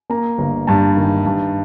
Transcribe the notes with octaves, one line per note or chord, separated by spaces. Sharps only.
A#3 A#5
G1
G2 A5
D#3
G2